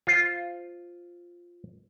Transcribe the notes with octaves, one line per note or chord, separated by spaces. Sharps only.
F4 C5